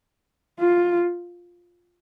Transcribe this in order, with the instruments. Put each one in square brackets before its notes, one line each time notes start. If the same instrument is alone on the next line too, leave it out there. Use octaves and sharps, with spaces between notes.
[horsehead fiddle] F4